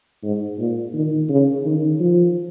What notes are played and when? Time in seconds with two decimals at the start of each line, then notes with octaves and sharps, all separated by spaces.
0.23 G#2
0.59 A#2
0.94 D#3
1.29 C#3
1.65 D#3
2.00 F3